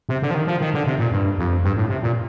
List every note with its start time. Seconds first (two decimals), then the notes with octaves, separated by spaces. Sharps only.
0.09 C3
0.22 D3
0.31 F3
0.35 D#3
0.47 F3
0.61 D#3
0.74 D3
0.86 C3
0.99 A#2
1.12 G2
1.38 F2
1.64 G2
1.77 A2
1.89 C3
2.03 A#2